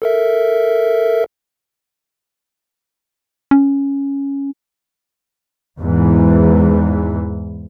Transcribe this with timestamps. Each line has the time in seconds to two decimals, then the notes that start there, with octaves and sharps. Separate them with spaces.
0.02 A4 A#4 E5
3.51 C#4
5.79 E2 G#2 E3